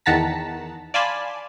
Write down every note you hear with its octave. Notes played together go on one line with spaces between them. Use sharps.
E2 D#3 F#5 A5 A#5 B6
D5 F5 G#5 A5 B5 C6